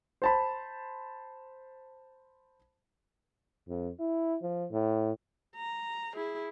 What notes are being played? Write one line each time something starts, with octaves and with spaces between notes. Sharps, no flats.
C5 A5 B5
F2
E4
F3
A2
A#5
E4 G#4